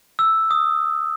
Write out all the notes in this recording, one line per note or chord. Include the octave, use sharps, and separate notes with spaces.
E6
D#6